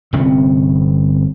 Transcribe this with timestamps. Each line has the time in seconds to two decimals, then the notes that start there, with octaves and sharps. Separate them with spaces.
0.13 G1 C3 C4 C#4